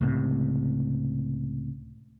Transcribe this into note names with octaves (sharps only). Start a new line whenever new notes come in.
C#2 A2 C3